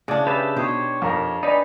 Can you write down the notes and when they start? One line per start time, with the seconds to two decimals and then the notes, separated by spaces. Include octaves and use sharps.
0.08 C#3 D4 E4 D5 F#5
0.27 G4 G#4 B4 E5 A5
0.56 B2 D#4 G4 C5 C#5 D#6
1.02 F2 A#4
1.43 D4 D#4 B4 D5 D#5 G5 G#5